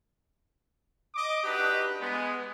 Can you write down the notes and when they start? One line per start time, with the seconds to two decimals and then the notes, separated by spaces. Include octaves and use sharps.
1.14 D#5 D6
1.44 D4 D#4 F#4 G4 B4
2.01 G#3 B3